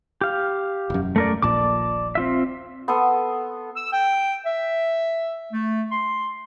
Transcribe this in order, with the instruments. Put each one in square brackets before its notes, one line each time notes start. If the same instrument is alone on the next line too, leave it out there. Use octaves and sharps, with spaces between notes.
[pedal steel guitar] G4 F5
[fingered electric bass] E1 F#2
[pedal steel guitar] A3 A#4 D5
[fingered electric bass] D#1 A#1 A#2 [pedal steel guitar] D5 A5 D6
[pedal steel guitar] C4 F4 E5
[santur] B3 A4 C6 D#6
[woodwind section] E6
G5
E5
A3
C6